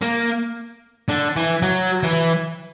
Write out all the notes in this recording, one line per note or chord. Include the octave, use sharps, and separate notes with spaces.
A#3
D3
E3
F#3
E3